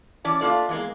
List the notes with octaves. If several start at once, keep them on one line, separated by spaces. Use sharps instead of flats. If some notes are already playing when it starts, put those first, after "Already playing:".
E3 C#4 D5 A5
A3 A#3 D4 F4 A4 D5
E2 G#3 A#3